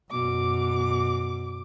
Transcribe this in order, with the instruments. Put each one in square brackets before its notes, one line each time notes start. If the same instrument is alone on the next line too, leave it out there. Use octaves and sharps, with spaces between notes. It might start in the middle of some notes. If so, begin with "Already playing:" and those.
[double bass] F#2 [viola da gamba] B2 [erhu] D6